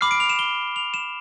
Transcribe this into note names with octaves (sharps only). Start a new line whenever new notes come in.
B5 D6 F6 C7
D7
F7
E7
G7
F7
E7